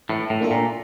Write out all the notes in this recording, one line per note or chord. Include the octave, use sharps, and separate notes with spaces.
A2 E3
A2
A#3 D4 F4 A4
A#2